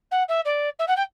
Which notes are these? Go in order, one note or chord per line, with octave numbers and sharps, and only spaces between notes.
F#5
E5
D5
E5
F#5
G5